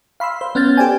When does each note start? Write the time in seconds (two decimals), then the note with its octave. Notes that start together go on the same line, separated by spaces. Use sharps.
0.20 F5 B5 C6 E6
0.41 C5
0.55 B3 C#4 F6 G6 A6
0.77 G4 A4 C5 D5 G5 G#5